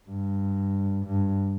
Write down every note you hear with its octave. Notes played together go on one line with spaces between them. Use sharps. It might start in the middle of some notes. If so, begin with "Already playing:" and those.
G2
G2